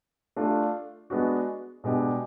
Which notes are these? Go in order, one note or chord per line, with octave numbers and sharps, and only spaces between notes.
A3 D4 F4
G#3 B3 D4 F#4
B2 G#3 B3 D4 G4